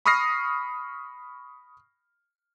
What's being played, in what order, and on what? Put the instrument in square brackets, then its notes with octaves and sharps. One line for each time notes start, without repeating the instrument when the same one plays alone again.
[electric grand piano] B5 C#6 D#6 F6 A#6 C7